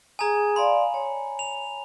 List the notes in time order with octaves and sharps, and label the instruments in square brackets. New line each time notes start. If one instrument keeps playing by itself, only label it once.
[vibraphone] G#4 D#6 [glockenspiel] G#5 A#5
[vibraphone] D5 F5 C6 [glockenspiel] B5
[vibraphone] C#5
[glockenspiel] F7